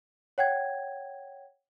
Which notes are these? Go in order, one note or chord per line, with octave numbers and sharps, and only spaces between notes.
C#5 F#5 G5 G#6